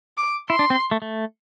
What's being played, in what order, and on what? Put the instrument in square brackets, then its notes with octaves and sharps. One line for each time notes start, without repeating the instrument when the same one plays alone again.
[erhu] D6
[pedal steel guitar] E4 [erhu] C6
[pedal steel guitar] D4
C4
A3
A3